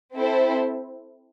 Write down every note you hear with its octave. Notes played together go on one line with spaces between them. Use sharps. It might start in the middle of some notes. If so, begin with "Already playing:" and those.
C4 E4 A4 C5